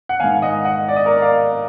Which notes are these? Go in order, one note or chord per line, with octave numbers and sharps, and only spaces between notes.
F#5
G#2 D#3 F5 G#5
D#5 F#5
D#5 F#5
D5
D#5
A#4 D5
D5 F5